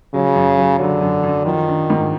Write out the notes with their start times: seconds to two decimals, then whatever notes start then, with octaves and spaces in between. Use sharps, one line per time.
0.14 C#3 F#3
0.36 F#2
0.58 F#3
0.79 D3 F#3
1.01 F#2
1.23 F#2
1.45 D#3 F3
1.68 D4
1.90 G#2